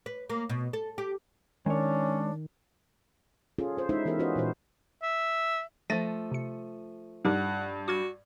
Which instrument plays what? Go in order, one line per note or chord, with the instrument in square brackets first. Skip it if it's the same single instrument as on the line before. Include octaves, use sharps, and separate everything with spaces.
[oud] B4
A#3
B2
A4
G4
[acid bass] D#3 [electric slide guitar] G#3 C#5 [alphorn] C#4 [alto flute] D4
[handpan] C#4 F4 G#4 A4
F4 C5
G#3 C#4 D#4 E4 C5 E5
E3 B3 G4 A#4 C5 E5
C#4 F4 F#4 B4 C5 D#5
A#2 E3 F#4 C5
[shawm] E5
[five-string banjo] F3 A3 [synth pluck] A6 A#6 [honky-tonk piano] D#7
[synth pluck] C3 C#7
[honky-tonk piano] G2 [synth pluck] D#4 G4 A#4 [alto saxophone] F#5
[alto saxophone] F#4 [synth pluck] D6 F6 G#6